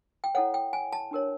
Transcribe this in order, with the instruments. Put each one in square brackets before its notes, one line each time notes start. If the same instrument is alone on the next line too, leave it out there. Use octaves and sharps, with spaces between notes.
[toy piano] G5
E4 A4 C#5 F#5
G5
G#5
A5
D4 G4 A#4 C#5